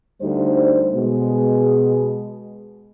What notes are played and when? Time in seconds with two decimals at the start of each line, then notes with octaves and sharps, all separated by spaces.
0.22 D2 G3 D#4 C5
0.94 B2 G#3